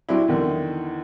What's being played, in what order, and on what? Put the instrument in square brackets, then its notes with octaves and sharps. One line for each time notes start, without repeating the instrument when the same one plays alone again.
[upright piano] F#3 C4 D4 E4
E2 D3 D#3